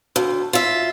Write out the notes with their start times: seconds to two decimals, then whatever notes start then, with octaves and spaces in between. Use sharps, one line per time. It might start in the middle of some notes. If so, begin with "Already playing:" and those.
0.16 D2
0.53 F4 E5